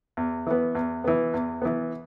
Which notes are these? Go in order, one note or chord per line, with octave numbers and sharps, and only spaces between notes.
E2
E3 B3
E2
E3 B3
E2
E3 B3